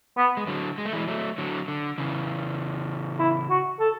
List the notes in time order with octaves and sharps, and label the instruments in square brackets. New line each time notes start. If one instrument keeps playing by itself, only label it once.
[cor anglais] B3
[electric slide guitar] G#3
D3 F#3
G#3
A3
E3 G#3
F#3 A3
D3 F#3
D3
C#3 E3
[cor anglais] E4
F#4
A4